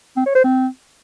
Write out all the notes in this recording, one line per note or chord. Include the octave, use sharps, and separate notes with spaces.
C4
C#5
C5
C4